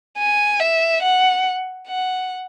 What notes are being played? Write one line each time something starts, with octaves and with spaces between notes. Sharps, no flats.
G#5
E5
F#5
F#5